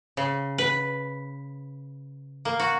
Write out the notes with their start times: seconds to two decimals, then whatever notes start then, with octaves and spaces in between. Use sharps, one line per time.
0.17 C#3
0.58 B4
2.45 A#3
2.60 F#4